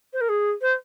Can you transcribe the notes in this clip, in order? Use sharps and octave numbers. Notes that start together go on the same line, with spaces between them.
C5
A#4
G#4
C5